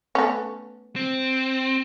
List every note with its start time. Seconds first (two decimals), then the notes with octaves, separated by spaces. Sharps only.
0.15 A3 B3 C#4
0.96 C4